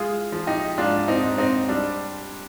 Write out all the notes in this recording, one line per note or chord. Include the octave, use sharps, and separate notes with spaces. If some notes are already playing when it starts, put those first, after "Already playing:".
Already playing: G#3 F4 G#4
F3
D#4 G4
G#2 D4 F4
C4 D#4
G#2
C4 D#4
G3 D4